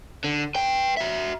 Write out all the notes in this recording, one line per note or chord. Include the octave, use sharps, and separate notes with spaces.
D3
B4 G5
F#4 E5